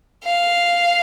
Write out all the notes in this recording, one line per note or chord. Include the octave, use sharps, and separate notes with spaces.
F5